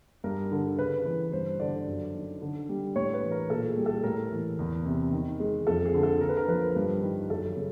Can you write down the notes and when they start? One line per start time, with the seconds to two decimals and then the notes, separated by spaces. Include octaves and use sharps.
0.24 G2 A#4
0.52 D3
0.78 C#3 B4
1.05 E3
1.32 G2 C5
1.60 D3 D5
1.87 F#2
2.14 D#3
2.42 D3
2.69 G3
2.96 A2 C#5
3.14 B4
3.23 E3
3.31 A#4
3.50 A#2 A4
3.68 G#4
3.77 G3
3.86 A4
4.04 A2 A#4
4.32 E3
4.59 E2
4.86 C3
5.13 D#3
5.40 G#3
5.67 F2 A4
5.86 G#4
5.94 D3
6.03 A4
6.21 D3 A#4
6.29 B4
6.37 A#4
6.48 F3 B4
6.76 G2
7.02 D#3
7.30 F#2 A4
7.57 C#3